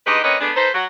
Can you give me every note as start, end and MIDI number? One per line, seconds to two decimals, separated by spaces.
0.07 0.19 43
0.07 0.19 56
0.07 0.19 63
0.07 0.19 67
0.07 0.19 71
0.07 0.19 75
0.24 0.36 58
0.24 0.36 60
0.24 0.36 61
0.24 0.36 71
0.24 0.36 73
0.24 0.36 75
0.41 0.51 56
0.41 0.51 57
0.41 0.51 59
0.41 0.51 62
0.56 0.69 63
0.56 0.69 69
0.56 0.69 71
0.56 0.69 72
0.74 0.84 54
0.74 0.84 66